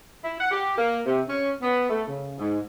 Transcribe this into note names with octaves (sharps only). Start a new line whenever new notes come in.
E4
F#5
G4
A#3
C3
C#4
B3
A3
C#3
G#2